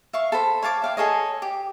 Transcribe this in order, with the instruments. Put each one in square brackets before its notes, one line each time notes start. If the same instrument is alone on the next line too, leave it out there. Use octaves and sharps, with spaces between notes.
[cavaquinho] E5 F5 C#6
A4 C5 B5
C#5 F5 A5 D6
E5 F5 G5
G#4 A4 C#5 D#5
G4